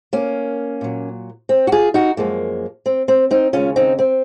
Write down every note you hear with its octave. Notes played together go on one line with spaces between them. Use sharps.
A#3 C#4
A#2 F#3
C4
F#4
F4 G#4
D#4 F#4
F#2 F3 G#3 A#3
C4
C4
C4 D#4
D#2 C#3 G#3 C#4 F4
C4 D#4
C4